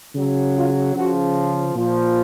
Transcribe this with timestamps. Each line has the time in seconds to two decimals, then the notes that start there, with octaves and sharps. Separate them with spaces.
0.15 C#3 F#3
0.55 F4
0.96 C#3 F3 F#4
1.75 A#2 F3